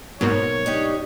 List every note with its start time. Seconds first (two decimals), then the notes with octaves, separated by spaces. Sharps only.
0.21 G#2 B2 F#3 A#3 C#5
0.66 D4 D#4 G4